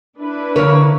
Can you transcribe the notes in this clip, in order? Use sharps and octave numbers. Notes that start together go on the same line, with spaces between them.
D4 E4 B4
D3 A#3 A#4 C#5